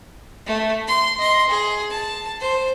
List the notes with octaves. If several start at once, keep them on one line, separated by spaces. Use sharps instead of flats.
A3
C6
D#5 C6
G#4
A5
C5